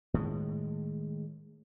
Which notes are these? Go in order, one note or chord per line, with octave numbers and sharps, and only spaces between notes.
A2 D#3 G#3